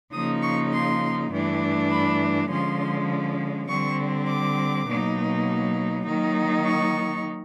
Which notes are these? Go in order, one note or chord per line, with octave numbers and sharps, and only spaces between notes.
C#3 F3 A#3 D#4 D#6
C#6
C6
G2 E3 A3 D4
B5
D3 F3 G#3 C#4 C6
D3 G3 C4 C#6
D6
B2 F#3 A#3 D#4
D#3 F#3 A#3 D#4
C#6